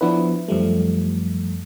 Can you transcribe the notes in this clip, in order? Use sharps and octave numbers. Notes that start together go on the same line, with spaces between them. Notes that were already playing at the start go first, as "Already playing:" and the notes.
F3 B3 D4 E4 B4
F#2 F3 G3 A3